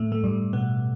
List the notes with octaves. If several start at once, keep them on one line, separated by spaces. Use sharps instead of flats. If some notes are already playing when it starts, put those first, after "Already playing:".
Already playing: A2 A3
A3
G2 G3
B2 B3